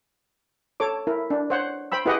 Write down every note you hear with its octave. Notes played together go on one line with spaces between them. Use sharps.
A4 C#5 D6
E4 A#4
D4
C5 C#5 F#5
C5 G5 B5 E6
E4 G4 G#4 B4 D#5 F#5